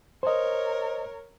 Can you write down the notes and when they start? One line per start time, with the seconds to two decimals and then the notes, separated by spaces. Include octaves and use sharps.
0.23 A#4 C5 C#5 D#5